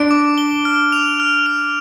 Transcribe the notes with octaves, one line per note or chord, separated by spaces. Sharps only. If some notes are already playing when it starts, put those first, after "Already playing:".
Already playing: D4 D7
D6
G7
F6
F7
F6
F7